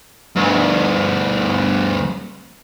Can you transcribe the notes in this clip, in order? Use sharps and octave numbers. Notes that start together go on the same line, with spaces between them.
D2 G2